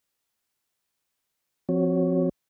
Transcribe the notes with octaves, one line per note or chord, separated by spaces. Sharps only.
F3 C4 F#4 C#5